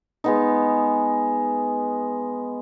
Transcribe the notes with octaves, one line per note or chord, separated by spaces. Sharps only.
G#3 B3 D#4